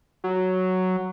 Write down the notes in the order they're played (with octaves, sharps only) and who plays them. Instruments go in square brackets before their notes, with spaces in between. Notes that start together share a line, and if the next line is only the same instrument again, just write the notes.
[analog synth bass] F#3